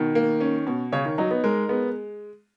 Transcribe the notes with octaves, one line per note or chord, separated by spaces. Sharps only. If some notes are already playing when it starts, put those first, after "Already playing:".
Already playing: B2 D#3
A#3
C#4
B2
C#3 C#5
D#3
F#3 D#4
B3
G#3 A#4
G#3 B3